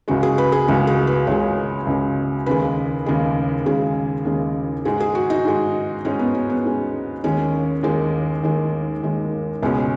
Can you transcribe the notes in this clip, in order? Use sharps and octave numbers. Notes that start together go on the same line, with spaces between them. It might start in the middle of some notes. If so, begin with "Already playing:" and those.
C#2 C#3 G#3 F#4
G#4
B4
G#4
C#2 C#3 G#3 F#4
G#4
B4
C#2 C#3 G#3 C#5
C#2 C#3 G#3
D#2 C#3 G#3 B4
D#2 C#3 G#3
D#2 C#3 G#3 G#4
D#2 C#3 G#3
G#2 G#3 G#4
G#4
F#4
D#4
G#2 G#3
G#2 G#3 C#4
B3
C#4
B3
G#2 G#3
D#2 D#3 G#3 C#4
D#2 D#3 G#3
D#2 D#3 G#3
D#2 D#3 G#3
C#2 B2 G#3 C#4